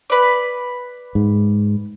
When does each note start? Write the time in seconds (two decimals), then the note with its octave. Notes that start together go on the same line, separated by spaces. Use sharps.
0.10 B4 D5
1.15 G#2